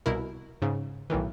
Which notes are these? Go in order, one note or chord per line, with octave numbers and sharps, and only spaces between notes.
C2 B2 E4 A#4
G#2 C#3
B1 A2 D#3 E3